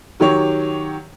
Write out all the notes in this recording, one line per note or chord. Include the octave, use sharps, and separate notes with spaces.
D#3 F#3 G4 C#5